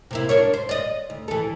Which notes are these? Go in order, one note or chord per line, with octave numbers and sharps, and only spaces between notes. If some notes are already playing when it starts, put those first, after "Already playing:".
C3 A#3 E4
D4 A#4 C#5
C5
D5 D#5
D2
E3 A4